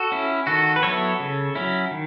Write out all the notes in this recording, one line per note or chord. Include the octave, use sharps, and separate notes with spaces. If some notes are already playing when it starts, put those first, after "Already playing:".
Already playing: F#4 A4
C#4 E4
D#3 F#4 A4
B4
F#3 B3 E4 A4 C#5
C#3
F#3 C#4 E4
D#3